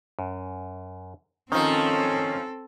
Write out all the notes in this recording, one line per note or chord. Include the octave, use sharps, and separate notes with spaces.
F#2
D#3 F3 C4 C#4 D#4 A4